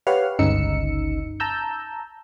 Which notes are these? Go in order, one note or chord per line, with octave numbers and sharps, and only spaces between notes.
G4 B4 C#5 F5 F#5 F6
G1 C#2 C#3 D#4 E6 C#7
A5 A#5 E6 G6